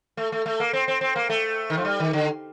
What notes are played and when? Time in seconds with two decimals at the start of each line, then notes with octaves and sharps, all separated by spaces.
0.17 A3
0.32 A3
0.46 A3
0.60 A#3
0.73 C4
0.88 C4
1.01 C4
1.16 A#3
1.30 A3
1.70 D#3
1.77 F3
1.85 G3
2.00 D#3
2.13 D3